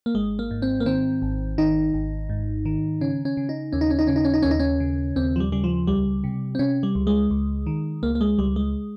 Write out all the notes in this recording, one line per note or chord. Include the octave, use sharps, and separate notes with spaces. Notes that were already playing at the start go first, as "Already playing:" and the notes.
A#3
G#1 G#3
A#3
G#2
C4
A#3
D#3 C4
G#1
D#3 D#4
G#1
G#2
D#3
C#3 C#4
C#4
C#3
D#4
D#2 C#4
D#4
C#4
D#4
C#3 C#4
D#4
C#4
D#4
D#2 C#4
D#4
C#4
C#3
D#2 C4
F3
G3
C#3 G3
F3
C#2 G3
C3
C4
C3 C#4
G3
C#2
G#3
C#2
D#3
C#2 A#3
A#3
G#3
C#2 G3
G#3